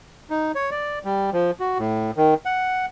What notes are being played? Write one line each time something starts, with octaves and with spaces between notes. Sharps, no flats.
D#4
C#5
D5
G3
F3
F#4
A2
D#3
F#5